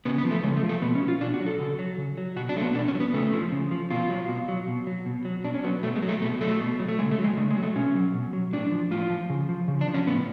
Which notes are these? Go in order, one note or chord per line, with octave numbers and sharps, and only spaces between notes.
C#3 B3
B3
F3
A3
C#3 G#3
A3
F3
A3
B2 B3
C#4
F#3
F4
B2 D4
F#4
F#3
A4
C#3
F#3
C#3
F#3
B2 F#4
D4
F#3 A3
B3
B2 D4
C#4
F#3
B3
C#3 A3
F3
C#3
F3
B2 F4
F#3
B2
F#3
B2
F#3
B2
F#3
B2 D4
C#4
F#3 B3
B2 A3
G#3
F#3
A3
B2 A3
F#3 A3
B2
F#3
A3
C#3 G#3
A3
F#3
G#3
C#3 A3
G#3
F#3
A3
B2 C#4
F#3
B2
F#3
A2 D4
F3
A2 F4
F3
C#3
F3
C#3
D4
F3
C#4
A2 B3